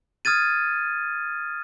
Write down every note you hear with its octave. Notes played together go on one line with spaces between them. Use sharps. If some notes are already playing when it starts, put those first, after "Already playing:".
D#6 F6 G#6 A6 D#7